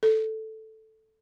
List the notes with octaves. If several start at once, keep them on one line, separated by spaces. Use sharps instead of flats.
A4